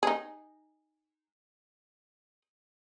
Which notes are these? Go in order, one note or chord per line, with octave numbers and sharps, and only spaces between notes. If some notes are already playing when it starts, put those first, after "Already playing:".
D#4 G#4